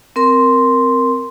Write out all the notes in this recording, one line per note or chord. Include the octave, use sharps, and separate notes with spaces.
C4 A#4 C6